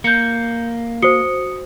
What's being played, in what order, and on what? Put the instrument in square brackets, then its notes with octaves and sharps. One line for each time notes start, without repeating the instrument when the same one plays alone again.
[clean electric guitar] A#3 [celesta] G6 C#7
[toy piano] F#4 C5 [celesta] D#6 C#7 G7